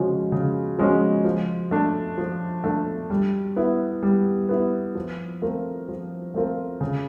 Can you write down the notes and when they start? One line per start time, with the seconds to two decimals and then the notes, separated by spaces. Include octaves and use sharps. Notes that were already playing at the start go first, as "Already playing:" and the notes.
Already playing: C#3 F3 G#3 C#4 F#4
0.32 C#3
0.79 F3 G#3 C#4 F#4
1.24 F3
1.71 A3 D4
2.18 F3
2.64 A3 D4
3.10 G3
3.56 B3 E4
4.03 G3
4.49 B3 E4
4.95 F3
5.42 A3 C4 F4 A#4
5.88 F3
6.34 A3 C4 F4 A#4
6.81 C#3